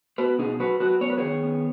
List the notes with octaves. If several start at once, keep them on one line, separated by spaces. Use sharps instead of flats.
B3 F#4 B4
B2 D#4 G#4
F#3 F#4 B4
F#3 F#4 B4
B3 C#5
B4
D#3 G#4 C#5
B3